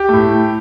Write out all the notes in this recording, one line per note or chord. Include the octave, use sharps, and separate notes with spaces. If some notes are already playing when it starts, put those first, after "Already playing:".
Already playing: G4
A2 A3